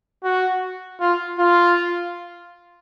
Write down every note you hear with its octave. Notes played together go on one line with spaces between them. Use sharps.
F#4
F4
F4